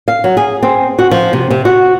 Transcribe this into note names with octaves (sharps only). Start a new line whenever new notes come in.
F5
F#3
G#4
C4
F#4
F3
C3
C3
F#4